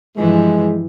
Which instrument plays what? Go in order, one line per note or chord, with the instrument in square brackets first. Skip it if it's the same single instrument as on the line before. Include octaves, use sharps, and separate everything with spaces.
[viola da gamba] G2 E3 F3 [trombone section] G#3